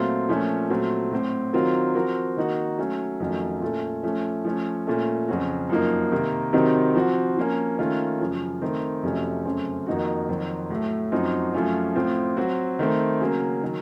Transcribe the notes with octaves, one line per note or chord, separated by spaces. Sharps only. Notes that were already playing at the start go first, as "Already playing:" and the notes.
Already playing: A#2 F#3 A3 C4 F4
A#2 F3 A3 C#4
A#2 F#3 A3 C4
A2 F#3 C4
D#3 F#3 C4 F4 A#4
F3 C4 F#4 A#4
D#3 A#3 D#4 F#4
F#3 A3 C#4
F2 D#3 F#3 A3 C#4
A#2 A3 C#4 A4
F3 A3 C#4
F3 A3 C#4
A#2 A3 C#4 A4
F2 C#3 F#3 C4 F#4
F#2 F3 A#3 D#4
C3 D#3 A#3
C3 D#3 F#3 C4 D#4
F3 C4 F#4
F3 A#3 C#4
D#3 A3 C#4 F4
F#2 C#3 F3
D#3 A3 C4
F2 C3 F#3 A3 C#4
F#2 C#3 A3 C4
F2 D#3 A#3 D#4 F#4
F2 D#3 F#3 C4 F#4
A2 F#3 A3
F#2 F3 C4 D#4 F#4
F#2 F3 A3 C#4 F4
A2 F3 C4 F4
F#3 C4 F#4
D#3 A3 C4
C#3 F#3 A#3
D#3 F#3